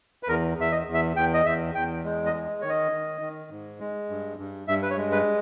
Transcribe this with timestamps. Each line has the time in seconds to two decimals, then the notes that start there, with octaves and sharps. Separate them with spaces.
0.23 B4
0.28 E2 A#4
0.58 E2 E5
0.72 D#5
0.87 E2
0.94 E5
1.16 E2 G5
1.34 D#5
1.45 E2 E5
1.75 E2 G5
2.04 G#3
2.26 D#5
2.33 G#3
2.62 D#3 C#5
2.69 D#5
2.92 D#3
3.21 D#3
3.50 G#2
3.80 G#3
4.10 G2
4.39 G2
4.68 G2 E5
4.83 B4
4.90 C#5
4.97 G#3
5.12 B4